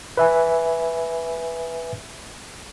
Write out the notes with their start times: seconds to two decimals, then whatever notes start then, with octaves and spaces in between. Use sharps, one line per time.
0.17 B4 E5 G#5